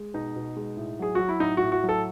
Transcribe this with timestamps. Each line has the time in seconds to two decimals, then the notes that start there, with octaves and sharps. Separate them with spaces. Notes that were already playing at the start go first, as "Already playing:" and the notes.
Already playing: G#3
0.14 B2 D#4
0.36 B2
0.57 G#3
0.77 A2
0.99 F#3 G#4
1.15 F#3 F#4
1.29 E4
1.40 A2 D#4
1.57 F#4
1.63 A2
1.72 F#4
1.84 F#3
1.89 A4